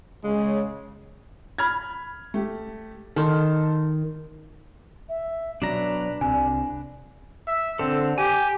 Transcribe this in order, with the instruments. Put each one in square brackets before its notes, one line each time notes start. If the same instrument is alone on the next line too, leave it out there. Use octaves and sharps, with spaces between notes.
[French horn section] C#3 [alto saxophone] G#3
[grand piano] B5 F6 G#6
A3 G4
[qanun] D#3 [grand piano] A4 A5 C6
[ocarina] E5
[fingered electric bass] B2 F#3 [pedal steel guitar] D4 B4 A#5 [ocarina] D5
[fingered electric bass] C2 C3 [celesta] G#5
[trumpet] E5
[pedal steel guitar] D3 A4 [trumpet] C4
[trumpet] G4 [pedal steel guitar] G#5